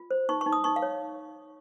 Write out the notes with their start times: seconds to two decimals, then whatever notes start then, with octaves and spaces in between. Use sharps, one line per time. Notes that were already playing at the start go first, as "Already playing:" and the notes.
Already playing: F4
0.11 C5
0.29 D#4 C#6
0.41 C#6
0.46 D#4
0.53 D#6
0.64 D#4 C#6
0.76 F5
0.82 C#5